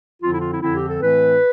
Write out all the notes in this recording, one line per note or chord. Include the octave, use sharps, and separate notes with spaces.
F2 D3 F3 C4 F4
E4
F4
E4
F2 D3 F3 C4 E4
G4
A4
A2 E3 A3 C4 B4